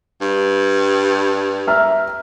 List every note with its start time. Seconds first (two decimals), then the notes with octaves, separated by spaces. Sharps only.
0.21 G2
1.67 E5 A#5 F6